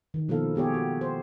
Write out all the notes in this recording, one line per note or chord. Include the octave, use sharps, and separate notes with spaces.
D#3
B2 F3 A#3 E4 A4 F5
B3 F4 G4 G#4 C#5
F#4
C5